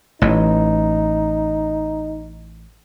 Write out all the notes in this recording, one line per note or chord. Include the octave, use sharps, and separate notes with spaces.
A1 E3 D#4